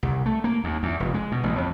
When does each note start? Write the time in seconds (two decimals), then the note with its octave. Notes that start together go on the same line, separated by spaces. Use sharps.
0.03 C2
0.26 A3
0.44 A#3
0.64 D#2
0.83 E2
1.00 F1
1.14 G#3
1.32 B2
1.44 A1
1.58 F2